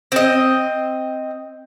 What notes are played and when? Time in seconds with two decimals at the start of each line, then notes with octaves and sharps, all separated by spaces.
0.12 C4 D#5